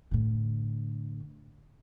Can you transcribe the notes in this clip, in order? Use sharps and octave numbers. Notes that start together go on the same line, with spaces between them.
A2 D3